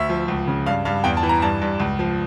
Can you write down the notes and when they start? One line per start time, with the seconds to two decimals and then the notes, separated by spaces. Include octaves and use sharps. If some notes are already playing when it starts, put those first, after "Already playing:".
Already playing: D2 E5
0.09 F3
0.28 C#2
0.47 C#3
0.66 G2 F5
0.85 G2 F5
1.04 E2 G5
1.17 A5
1.23 E3
1.29 A#5
1.42 G2 A5
1.62 G2
1.80 C#2
1.99 F3